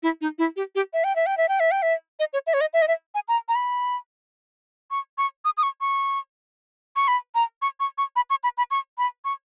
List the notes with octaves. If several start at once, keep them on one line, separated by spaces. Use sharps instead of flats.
E4
D#4
E4
G4
G4
E5
G5
E5
G5
E5
G5
E5
G5
E5
D#5
C#5
E5
C#5
D#5
E5
D#5
E5
G#5
A#5
A#5
B5
C#6
C#6
D#6
D#6
C#6
C#6
C#6
B5
A#5
C#6
C#6
C#6
B5
C#6
B5
B5
C#6
B5
C#6